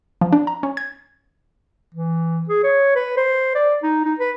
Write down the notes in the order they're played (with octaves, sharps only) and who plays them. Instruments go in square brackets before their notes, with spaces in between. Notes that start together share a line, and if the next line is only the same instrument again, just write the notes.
[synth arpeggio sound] F3
D4
A#5
C#4
G#6
[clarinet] E3
G#4
C#5
B4
C5
D5
D#4
D#4
B4